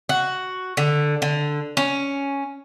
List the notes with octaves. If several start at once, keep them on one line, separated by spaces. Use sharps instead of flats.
F#4
D3
D3
C#4